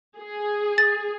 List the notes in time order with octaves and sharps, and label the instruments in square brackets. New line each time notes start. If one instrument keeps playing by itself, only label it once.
[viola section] G#4
[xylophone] A6